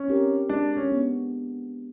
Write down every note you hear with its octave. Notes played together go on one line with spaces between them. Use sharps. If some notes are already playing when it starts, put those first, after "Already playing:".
Already playing: C#4
C4 D#4 G4 A#4
G#3 D4
C#4
B3 D4